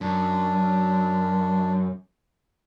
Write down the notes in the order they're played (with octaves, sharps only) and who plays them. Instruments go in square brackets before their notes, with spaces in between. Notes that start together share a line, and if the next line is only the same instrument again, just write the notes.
[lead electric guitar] F#2 [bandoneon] D4